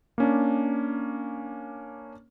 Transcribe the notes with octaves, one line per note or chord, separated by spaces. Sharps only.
A#3 C#4 D4